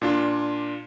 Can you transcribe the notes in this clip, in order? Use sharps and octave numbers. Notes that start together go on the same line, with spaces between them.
A#2 D4 F4